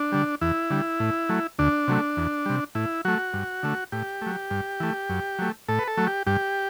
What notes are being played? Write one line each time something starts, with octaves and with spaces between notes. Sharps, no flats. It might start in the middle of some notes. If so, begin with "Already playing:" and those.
Already playing: D4
D3 G3
E2 E4
D3 G3
A2
F#3 A3
D2 D4
C3 F#3 A3
E2
C3 G3
A2 E4
F#3 A3 F#4
G2
D3 A3
A2 G4
F#3 A3
G2
E3 A3
F#2
F#3 A3
A2 A4
B4
A4
F#3 A3
G4
G2 G4